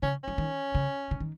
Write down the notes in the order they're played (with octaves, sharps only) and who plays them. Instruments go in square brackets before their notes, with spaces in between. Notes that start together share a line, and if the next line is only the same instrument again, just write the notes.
[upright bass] C#3 [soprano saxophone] C#4
[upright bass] F#3 [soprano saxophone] C#4
[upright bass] D#3
C#3
C#3
D#3